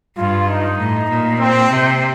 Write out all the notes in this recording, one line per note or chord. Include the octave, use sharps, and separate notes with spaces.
G2 F4
D#4
A2
A#2
C4
C3